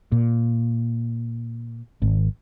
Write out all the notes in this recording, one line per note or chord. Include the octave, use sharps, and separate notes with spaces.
A#2
G#1